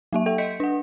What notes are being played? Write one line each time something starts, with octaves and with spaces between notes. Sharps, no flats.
F#3 A#3 E5
A4 E5 G5
D#5 G6 B6 C#7
D4 F#5